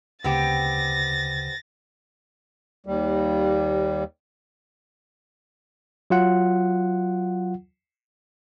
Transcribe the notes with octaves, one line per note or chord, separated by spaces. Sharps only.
D2 C#3 B3 C4 G4 A6 A#6
D#2 G3
F#3 F4 F#5